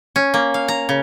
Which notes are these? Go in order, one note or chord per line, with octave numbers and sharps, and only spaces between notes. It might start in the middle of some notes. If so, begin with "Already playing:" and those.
C#4
A#3
F5
A#5
C#3